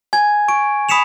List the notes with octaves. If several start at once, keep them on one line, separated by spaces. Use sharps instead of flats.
G#5 G#6
C#6 D7
B5 D#6 B6 C#7 E7 F7